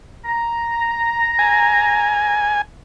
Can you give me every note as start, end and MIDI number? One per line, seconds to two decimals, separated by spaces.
0.25 2.58 82
1.39 2.62 80